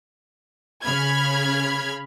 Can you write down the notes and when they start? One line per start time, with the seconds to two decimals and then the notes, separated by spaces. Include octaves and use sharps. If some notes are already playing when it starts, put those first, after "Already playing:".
0.83 C#3 B5 F6 G#6